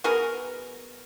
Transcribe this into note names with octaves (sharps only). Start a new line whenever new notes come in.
B3 F#4 G#4 A#4